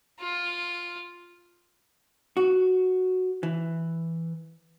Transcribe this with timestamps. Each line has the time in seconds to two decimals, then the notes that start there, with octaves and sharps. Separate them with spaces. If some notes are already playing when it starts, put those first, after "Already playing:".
0.20 F4
2.37 F#4
3.43 E3